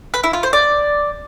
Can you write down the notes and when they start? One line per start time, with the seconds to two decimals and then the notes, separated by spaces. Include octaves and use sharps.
0.14 B4
0.24 E4
0.33 F4
0.43 C5
0.53 D5